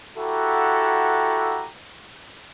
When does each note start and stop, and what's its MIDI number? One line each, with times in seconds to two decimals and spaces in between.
0.17 1.67 64
0.17 1.67 66
0.17 1.67 67
0.17 1.67 69
0.17 1.67 78
0.17 1.67 82